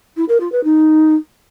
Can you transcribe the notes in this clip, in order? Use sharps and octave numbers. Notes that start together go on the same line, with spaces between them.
E4
A#4
F4
B4
D#4